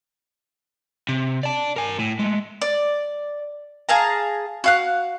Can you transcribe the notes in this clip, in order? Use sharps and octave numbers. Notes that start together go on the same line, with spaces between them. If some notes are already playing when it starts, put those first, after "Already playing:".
C3
D5 A5
A#4 G#5
A2
G#3 A3
D5
G#4 F5 A5 A#5
F#4 F5 F#6